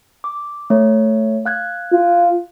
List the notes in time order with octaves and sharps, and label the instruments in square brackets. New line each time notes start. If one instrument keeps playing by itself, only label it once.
[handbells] D6
A3 C#5
F5 F#6 G#6
[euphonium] F4